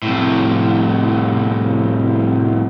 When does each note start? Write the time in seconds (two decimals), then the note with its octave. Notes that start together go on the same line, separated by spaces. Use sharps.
0.02 C2 A2